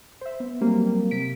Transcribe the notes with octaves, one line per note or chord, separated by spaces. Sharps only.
C5 E5
B3
F#3 G3 A#3 C4
C3 B6 D7